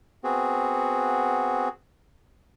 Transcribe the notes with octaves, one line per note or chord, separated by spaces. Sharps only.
B3 C4 F#4 G#4